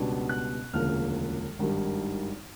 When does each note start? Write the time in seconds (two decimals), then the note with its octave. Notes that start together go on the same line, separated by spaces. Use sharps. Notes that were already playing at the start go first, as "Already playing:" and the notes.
Already playing: C#2 B2 G3 B3 D4
0.29 F#6
0.73 E1 D2 C#3 F3 A#3 F6
1.59 G#1 G2 D#3 G3